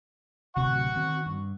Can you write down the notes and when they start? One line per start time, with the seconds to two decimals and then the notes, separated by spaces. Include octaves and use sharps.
0.56 D1 C3 F#5 C#6
0.95 D#3 C4
1.26 G2